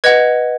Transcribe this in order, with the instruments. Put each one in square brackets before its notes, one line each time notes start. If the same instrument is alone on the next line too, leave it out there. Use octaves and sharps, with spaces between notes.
[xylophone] B4 D#5 F#5 G#6